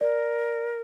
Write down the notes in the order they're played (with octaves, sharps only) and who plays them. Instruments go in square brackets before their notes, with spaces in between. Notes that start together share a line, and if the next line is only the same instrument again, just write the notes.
[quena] A#4 [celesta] D5